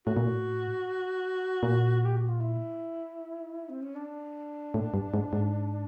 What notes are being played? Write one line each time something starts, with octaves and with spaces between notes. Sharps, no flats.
A2 F#4
A#2
A2
A#2
G4
F#4
F4
E4
C4
C#4
D4
A2
G2
G#2
G#2